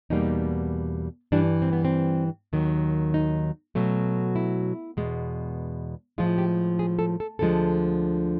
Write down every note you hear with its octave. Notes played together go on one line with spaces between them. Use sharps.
E2 B2 G3 A#3 D#4
G2 E3 G3 D4
C4
B3
C4
D#2 D#3 F#3
D#4
B2 F#3 A3
E4
E2 B2 G#3
A2 F3 G#3 F4
G4
G#4
A4
A4
D2 D3 F3 G#3 A4